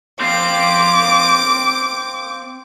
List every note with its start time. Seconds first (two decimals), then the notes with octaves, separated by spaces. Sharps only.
0.21 C4 F5 D6